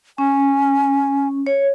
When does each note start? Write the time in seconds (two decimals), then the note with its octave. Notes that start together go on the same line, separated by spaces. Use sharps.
0.18 C#4 G#5
1.46 C#5